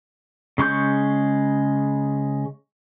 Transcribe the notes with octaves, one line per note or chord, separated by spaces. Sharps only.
C#3 G#3 C#6 G6